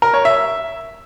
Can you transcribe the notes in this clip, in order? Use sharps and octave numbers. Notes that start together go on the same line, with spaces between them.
A#4
C#5
E5